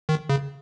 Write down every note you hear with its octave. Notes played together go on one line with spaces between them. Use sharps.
D#3
C#3